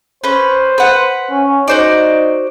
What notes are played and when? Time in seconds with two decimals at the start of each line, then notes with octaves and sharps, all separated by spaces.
0.24 C#4 B4 C5
0.78 B4 F#5
1.30 C#4
1.68 D#4 F#4 C5 D5